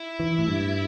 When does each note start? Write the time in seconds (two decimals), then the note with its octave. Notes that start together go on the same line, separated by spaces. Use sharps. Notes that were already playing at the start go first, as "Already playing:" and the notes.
Already playing: E4
0.20 E3
0.39 A2
0.48 G2